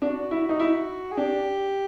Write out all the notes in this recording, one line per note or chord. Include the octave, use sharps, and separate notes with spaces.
D4 F#4
E4
D#4
E4
G#4
D4 G4